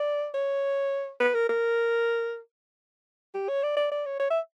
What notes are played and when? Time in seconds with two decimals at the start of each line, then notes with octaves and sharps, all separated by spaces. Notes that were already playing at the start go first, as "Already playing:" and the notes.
Already playing: D5
0.34 C#5
1.20 B4
1.34 A#4
1.49 A#4
3.34 G4
3.48 C#5
3.63 D5
3.77 D5
3.91 D5
4.06 C#5
4.20 C#5
4.30 E5